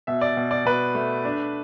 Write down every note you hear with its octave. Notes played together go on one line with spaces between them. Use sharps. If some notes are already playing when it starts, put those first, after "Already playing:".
B2 E5
D5
B2
D5
B2 B4
A3
D4